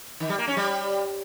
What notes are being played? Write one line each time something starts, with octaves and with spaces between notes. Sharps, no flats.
D#3
G3
A#3
C#4
G3